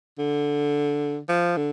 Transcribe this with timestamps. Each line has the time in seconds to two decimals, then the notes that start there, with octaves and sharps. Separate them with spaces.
0.19 D3
1.29 F3
1.57 D3